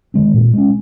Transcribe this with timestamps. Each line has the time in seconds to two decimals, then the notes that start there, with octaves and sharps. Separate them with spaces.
0.14 D#3 G#3 C4
0.34 A#2
0.53 G#3 C#4